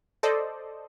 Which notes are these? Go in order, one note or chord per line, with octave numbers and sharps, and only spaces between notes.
A4 C5 D5 D#5